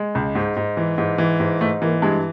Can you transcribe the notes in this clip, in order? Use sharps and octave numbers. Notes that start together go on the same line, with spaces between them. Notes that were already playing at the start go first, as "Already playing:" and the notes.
Already playing: G#3
C#2
G#2
G#2
E3
G#2
E3
G#2
G#2 A3
E3 A#3
G2 G#3